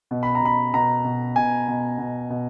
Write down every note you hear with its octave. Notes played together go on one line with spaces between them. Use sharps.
B2
B5
A#5
B2 B5
B2 A#5
B2
B2 G#5
B2
B2
B2